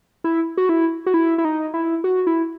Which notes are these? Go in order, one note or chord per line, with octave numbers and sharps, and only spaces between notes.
E4
F#4
E4
F#4
E4
E4
D#4
E4
F#4
E4